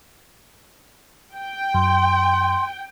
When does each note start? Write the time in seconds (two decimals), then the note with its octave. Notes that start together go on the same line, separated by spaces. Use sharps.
1.36 G5
1.74 F#2 C6